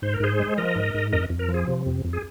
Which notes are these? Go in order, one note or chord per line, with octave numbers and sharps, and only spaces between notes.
G#2 C5
A#4
G#2 G#4 C5
G#3
F3 A#4 D#5
G#2
G#2
F2 A#4 D#5
F2
A#4
F3
G#4
C3
F2
F2
G#4